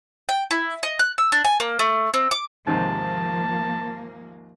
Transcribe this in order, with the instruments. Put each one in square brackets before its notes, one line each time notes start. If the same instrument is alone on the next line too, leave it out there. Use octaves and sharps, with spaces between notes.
[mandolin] G5
E4
D#5
F#6
E6
D4
G#5
A#3
A3
C4
D6
[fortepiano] D#2 G#2 C3 [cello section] F3 A#3 [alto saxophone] A5